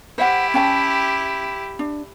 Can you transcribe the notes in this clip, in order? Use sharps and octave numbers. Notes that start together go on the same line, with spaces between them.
E4 G4 C5 E5 F#5
C#4 G5 A5
D4